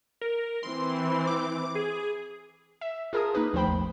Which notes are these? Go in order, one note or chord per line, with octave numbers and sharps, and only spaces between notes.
A#4
E3 C4 C6
D6
G#4
E5
F4 G#4 A#4 A5 A#5 D#6
A#3 D#4 B4
D#2 F3 A3 C5 G5 B5
A1 E2